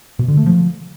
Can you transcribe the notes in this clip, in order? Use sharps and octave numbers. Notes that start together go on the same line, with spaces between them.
B2
D3
A3
F3